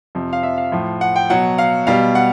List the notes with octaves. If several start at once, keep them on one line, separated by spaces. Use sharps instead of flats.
F2 C3 F3
F5
E5
F5
A2 F3
F#5
G5
B2 F#3 F#5
F5
B2 G3 F5
F#5